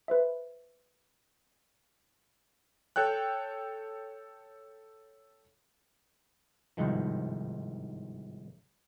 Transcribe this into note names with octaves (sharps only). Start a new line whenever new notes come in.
B4 C5 E5
A4 C#5 G5 F#6
G1 C2 G#2 D#3 F3